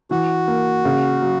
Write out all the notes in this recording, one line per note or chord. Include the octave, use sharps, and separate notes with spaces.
E3 F#4
A#3
C#3
F#3